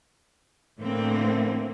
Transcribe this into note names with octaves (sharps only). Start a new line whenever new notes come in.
A2 D3 E3 A#3 C4